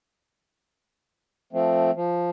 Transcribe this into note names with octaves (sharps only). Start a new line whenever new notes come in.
F3 A3 C4
F3